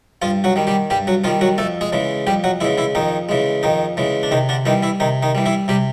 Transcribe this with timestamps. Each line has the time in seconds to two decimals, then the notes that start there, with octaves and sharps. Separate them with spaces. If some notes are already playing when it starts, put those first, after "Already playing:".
0.22 G2 F3 F4
0.44 F#3 F#4
0.56 D#3 G3
0.67 G3 G4
0.90 G2 G3 G4
1.07 F#3 F#4
1.24 D#3 F3 G3 F4
1.41 F#3 F#4
1.58 F2 A3 A4
1.81 G#3 G#4
1.92 C#3 E3 G#3
2.27 F2 G3 G4
2.44 F#3 F#4
2.61 C#3 E3 G#3 E4
2.78 E3 E4
2.95 F2 D#3 D#4
3.29 C#3 E3 G#3
3.63 F2 D#3 D#4
3.97 C#3 E3 G#3
4.23 D4
4.31 C3 D#3 D#4
4.49 D3 D4
4.65 D#3 E3 G3 D#4
4.83 E3 E4
5.00 C3 D#3 D#4
5.23 D#3 D#4
5.35 E3 G3
5.46 E3 E4
5.68 C3 G3 G4